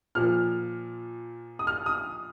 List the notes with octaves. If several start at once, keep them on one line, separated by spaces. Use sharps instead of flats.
A#2 F3 F6
D#6
F6
D#6